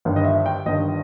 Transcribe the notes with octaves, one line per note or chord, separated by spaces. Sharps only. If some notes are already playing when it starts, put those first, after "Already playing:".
G1 G2 D#3
D#5
E5
G5
G1 G2 D#3 D#5